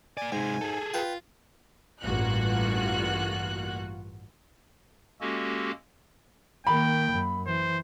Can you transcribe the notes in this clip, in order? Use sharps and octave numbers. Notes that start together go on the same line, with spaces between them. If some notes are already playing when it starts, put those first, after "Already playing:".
A#3 D5 G#5
G#2 C3 G#3 G#5
G#4 A4
F4 B4 G5
A1 G2 A#3 F4 F#4 F#6
G#3 A#3 C#4 F#4 G4 A4
D#3 A#3 G5 B5
F#2
E3 C5